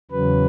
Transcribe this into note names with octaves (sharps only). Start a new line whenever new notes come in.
E2 C#3 F#3 B4